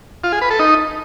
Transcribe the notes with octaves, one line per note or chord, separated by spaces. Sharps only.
F4
G#4
B4
A4
D#4